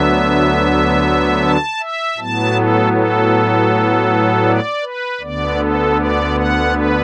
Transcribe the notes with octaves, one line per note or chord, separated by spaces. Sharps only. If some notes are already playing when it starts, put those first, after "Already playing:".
Already playing: D2 D3 F#3 B3 E5
A5
E5
A2 F#3 B3 A5
A4
A4
D5
B4
D2 D3 B3 D5
A4
D5
F#5
B4